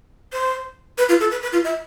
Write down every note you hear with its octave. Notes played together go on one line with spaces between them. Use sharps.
C5
B4
F4
A4
B4
B4
F4
E5